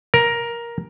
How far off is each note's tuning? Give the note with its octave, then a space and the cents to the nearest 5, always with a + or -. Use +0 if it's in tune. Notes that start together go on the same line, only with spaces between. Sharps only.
A#4 +10